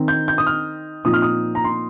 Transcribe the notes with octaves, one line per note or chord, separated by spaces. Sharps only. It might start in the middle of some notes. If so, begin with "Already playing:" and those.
Already playing: D#3 C4 D#4
G6
G6
D#6
F6
A#2 F3 C4 D#4 D#6
F6
D#6
A#5
C6